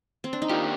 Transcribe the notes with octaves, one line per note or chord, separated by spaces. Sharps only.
C4
D4
D#4
D#3 A#3 D4 F4 G4